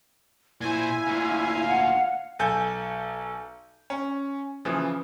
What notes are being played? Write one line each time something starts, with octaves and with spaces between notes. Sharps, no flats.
A#2 E4 C5 G#5
D2 A#2 F5
F#5
B1 A4 G#5 G6
C#4
C#3 E3 F3